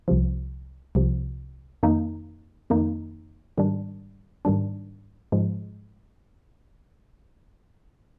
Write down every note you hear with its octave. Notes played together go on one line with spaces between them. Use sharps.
C2 C3 F3
C2 C3 F3
F2 D#3 A#3 D#4
F2 D#3 A#3 D#4
G#2 D#3 G3 D4
G#2 D#3 G3 D4
G#2 F3 G#3